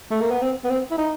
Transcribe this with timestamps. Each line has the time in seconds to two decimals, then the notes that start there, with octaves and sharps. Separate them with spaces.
0.11 A3
0.21 A#3
0.31 B3
0.41 C4
0.64 B3
0.69 C4
0.91 E4
0.98 D#4